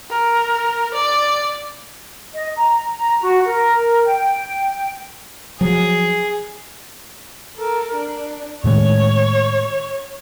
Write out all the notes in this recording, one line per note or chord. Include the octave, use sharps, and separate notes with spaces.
A#4
D5
D#5
A#5
A#5
F#4
A#4
G5
F3 F#3 G#4
A4 A#4
D4
A2 D#3 G#3 C#5